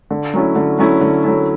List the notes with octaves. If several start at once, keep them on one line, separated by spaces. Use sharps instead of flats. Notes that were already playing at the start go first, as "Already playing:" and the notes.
D3
F#3 A3 C#4 E4
D3
F#3 A3 C#4 E4
D3
F#3 A3 C#4 E4